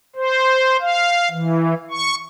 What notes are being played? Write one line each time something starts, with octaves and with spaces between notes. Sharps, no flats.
C5
F5
E3
C#6